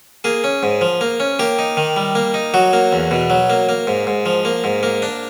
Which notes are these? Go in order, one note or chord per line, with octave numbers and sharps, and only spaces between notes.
A#3 G#4
C#4
G#2
F3
A#3
C#4
A#3 G4
D#4
D#3
G3
A#3
D#4
F#3 F#4
A#3
E2
B2
F#3
A#3
A#3
G#2
G#2
F3
A#3
G#2
A#3
D4